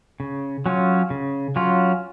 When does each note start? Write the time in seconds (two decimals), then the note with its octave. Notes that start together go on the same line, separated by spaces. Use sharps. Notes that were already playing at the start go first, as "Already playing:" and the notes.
0.20 C#3
0.66 F#3 C#4 F4
1.10 C#3
1.56 F#3 C#4 F4